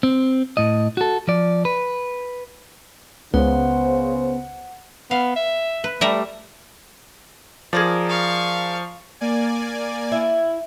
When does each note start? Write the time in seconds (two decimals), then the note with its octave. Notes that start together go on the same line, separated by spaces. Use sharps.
0.03 C4
0.57 A2 D#5
0.97 F#4 A4
1.28 F3 D5
1.65 B4
3.34 C#2 C#3 B3 C5 F#5
5.11 B3 F5
5.36 E5
5.84 B4
6.01 G3 A3 E5 A#5
7.73 F3 G#4 A#4 D5
8.09 F5 C#6
9.21 A#3 D5 G#5
10.12 E4